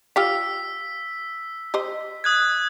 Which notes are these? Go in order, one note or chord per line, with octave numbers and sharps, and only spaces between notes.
F4 G4 F5 E6 B6
G4 C5 D#5
D#6 F#6 G#6